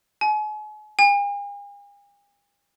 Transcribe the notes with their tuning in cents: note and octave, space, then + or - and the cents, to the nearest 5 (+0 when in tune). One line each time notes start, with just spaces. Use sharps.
G#5 +40
G#5 -45